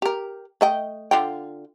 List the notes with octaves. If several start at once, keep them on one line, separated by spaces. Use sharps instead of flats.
G4 A#4
A3 D#5 G5
D3 F4 G5